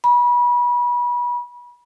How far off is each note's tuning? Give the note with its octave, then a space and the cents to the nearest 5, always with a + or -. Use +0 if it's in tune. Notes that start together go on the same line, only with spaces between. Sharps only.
B5 -30